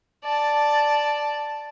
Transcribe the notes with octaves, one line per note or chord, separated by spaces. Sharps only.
D5 A5